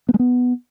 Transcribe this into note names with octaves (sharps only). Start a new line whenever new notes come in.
B3
G#3
B3